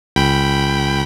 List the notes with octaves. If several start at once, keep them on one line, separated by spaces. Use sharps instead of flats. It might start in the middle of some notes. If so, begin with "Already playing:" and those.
C#2 G5 B5